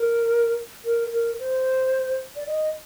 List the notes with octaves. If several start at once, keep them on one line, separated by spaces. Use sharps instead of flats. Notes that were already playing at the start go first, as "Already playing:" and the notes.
Already playing: A#4
A#4
A#4
C5
D5
D#5